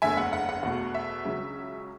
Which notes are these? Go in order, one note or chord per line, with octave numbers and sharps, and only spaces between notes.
F#1 E2 D3 A3 E5 G#5
F#5
F#5
F#5
E2 B2 A3 F#5
E5
C#2 C#3 F#3 C#4